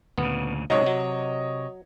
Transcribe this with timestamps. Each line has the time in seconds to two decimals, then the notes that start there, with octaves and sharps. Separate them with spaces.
0.18 D2 A#2 C#3 B3
0.70 C#2 G#2 C3 F#3 C#5 D#5
0.86 F#3